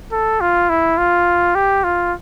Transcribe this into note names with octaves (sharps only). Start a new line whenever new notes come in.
A4
F4
E4
F4
G4
F4